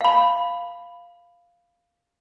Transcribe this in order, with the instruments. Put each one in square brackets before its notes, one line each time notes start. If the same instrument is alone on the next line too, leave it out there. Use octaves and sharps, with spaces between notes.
[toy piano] F5 B5